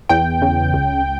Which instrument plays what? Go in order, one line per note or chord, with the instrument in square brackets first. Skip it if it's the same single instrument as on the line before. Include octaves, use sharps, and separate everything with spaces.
[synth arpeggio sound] E2 G5
C#3
C#2